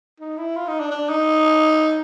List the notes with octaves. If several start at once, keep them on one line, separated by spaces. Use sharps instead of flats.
D#4
E4
F4
D#4
D4
D4
D#4